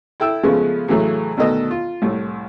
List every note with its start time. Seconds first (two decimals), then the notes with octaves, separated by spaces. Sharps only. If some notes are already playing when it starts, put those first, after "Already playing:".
0.20 E4 A4 G5 E6
0.43 C#3 F3 G#3 A3 B3 C#4
0.88 A2 C#3 E3 F#3 A3
1.37 D2 B2 D#3 B3 A4 D#5
1.71 F4
2.02 C2 A2